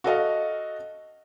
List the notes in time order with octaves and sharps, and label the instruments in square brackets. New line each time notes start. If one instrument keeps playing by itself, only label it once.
[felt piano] F#4 A4 D#5 F5